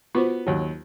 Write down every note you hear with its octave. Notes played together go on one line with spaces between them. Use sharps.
B3 F4 F#4 C5
D#2 F#3